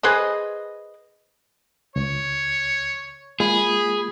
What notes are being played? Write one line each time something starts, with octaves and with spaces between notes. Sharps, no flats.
G#4 B4 C5 D#5
C#2 C#5
G#3 A#3 F4 G#4 B5